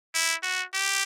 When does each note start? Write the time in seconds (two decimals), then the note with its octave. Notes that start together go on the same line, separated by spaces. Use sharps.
0.14 E4
0.43 F#4
0.73 G4